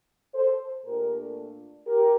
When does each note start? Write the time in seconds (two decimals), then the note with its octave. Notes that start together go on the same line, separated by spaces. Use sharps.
0.35 A4 C5
0.85 A#2 A3 D4 G4 A#4
1.87 G4 A#4